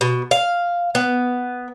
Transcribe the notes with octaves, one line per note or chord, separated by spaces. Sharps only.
B2
F5
B3